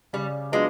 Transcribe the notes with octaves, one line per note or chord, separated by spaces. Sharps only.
C#3 G3
F#3 G#3 B3 D4 F4